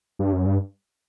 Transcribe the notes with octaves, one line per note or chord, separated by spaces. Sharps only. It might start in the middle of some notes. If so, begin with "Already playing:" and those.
G2
F#2
G2